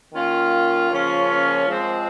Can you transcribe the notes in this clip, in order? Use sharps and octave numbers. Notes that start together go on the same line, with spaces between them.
D#3 A#3 C#4 F4
C#3 F3 A#3 C#4 F4
F3 G#3 C4